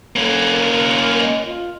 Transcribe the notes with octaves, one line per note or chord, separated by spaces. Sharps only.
A#3 C#4 A4
A#4
A#4
D#5
F4